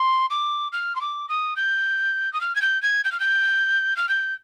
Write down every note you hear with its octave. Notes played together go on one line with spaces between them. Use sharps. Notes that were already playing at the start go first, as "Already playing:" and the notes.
Already playing: C6
D6
F6
C6
D6
D#6
G6
D#6
F6
G#6
G6
G#6
G6
F6
G6
F6
G6